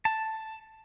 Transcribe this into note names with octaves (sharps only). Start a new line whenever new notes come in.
A5